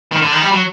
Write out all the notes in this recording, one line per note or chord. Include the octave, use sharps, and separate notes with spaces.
D#3
D3
D#3
G3
F#3